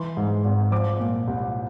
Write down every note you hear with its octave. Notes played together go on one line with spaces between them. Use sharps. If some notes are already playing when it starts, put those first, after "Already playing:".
Already playing: E3 C6
G#2
G#1
F3 D6
A#2
C2